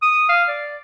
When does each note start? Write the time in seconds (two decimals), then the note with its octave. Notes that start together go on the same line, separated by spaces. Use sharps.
0.02 D#6
0.29 F5
0.48 D5